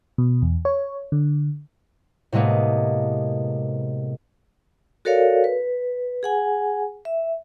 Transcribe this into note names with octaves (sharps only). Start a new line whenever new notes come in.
B2
E2
C#5
D3
A2 C3 G#3 A#3 B3
F#4 A4 A#4 C#5 D5 F5
B4
G#4 F#5 G#5
E5